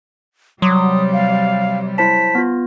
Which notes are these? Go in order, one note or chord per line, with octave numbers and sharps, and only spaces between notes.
C3 F#3 G3 C6 D6 D#6
F5
E4 C5 A5 B6
B3 F4